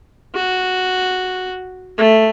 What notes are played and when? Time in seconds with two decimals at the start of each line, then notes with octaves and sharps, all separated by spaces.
0.35 F#4
1.98 A3